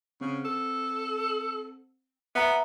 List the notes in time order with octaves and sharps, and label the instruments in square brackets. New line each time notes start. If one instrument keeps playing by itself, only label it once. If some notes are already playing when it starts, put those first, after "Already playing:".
[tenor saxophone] C#3 [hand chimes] C4
[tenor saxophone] A4
[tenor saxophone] B3 [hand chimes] E5 A#5